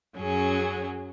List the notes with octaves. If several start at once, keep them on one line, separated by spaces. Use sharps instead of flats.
F#2 F#3 C#4 G#4